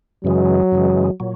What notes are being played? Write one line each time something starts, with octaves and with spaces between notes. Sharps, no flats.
F#2 C#3 E3 F#3 G#3
F#2 C#3 E3 G#3
A#2 F#3